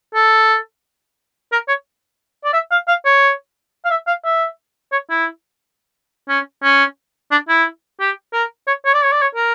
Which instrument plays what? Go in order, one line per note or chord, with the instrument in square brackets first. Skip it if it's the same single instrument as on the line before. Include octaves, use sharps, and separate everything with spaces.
[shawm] A4
A#4
C#5
D5
E5
F5
F5
C#5
F5
E5
F5
E5
C#5
E4
C#4
C#4
D4
E4
G4
A#4
C#5
C#5
D5
C#5
D5
C#5
A#4